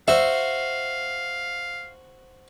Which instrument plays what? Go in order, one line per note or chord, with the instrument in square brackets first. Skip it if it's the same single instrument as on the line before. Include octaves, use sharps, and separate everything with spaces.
[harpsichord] F#4 C5 [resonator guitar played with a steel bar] E5 [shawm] F5